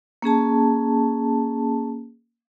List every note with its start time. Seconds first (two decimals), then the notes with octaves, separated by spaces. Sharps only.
0.22 A#3 C#4 G#4 A5